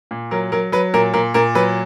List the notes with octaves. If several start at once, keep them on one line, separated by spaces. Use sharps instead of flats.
A#2
F#3 A#4
F#3 A#4
F#3 B4
A#2 A#4
A#2 A#4
A#2 A#4
F#3 B4